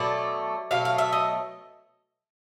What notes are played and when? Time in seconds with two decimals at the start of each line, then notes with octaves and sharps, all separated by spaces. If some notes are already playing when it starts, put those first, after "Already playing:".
Already playing: B2 F#3 A3 D5
0.71 B2 F#3 A3 F5
0.85 F5
0.98 E5
1.13 D#5